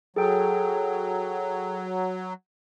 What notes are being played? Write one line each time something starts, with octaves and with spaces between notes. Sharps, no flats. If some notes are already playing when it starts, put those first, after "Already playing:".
F#3 G#4 A4 G5